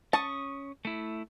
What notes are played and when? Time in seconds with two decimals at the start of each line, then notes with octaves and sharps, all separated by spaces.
0.13 C#4 A5 C#6 D#6
0.85 A3 E4